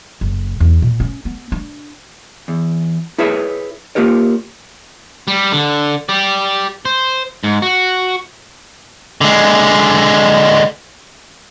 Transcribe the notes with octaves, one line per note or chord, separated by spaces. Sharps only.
F#1
E2
A#2
C#4
B3
D4
E2
E4 G#4 B4 C#5 E5
A#3 F4 G4 A#4 C#5
G3
D3
G4 D5
C5
G#2
F#4
D3 G#3